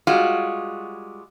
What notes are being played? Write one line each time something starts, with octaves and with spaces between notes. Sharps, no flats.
G3 G#3 F4 F#4